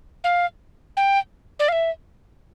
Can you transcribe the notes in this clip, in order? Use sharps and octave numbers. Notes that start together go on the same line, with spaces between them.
F5
G5
D5
F5
E5